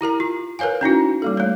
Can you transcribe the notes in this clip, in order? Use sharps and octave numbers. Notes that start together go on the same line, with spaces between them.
E4 G4 A#4 A#5
F4
A#4 B4 C#5 F5 G#5
C#4 D#4 E4 F#4
G3 A#3 A4
A3 C#5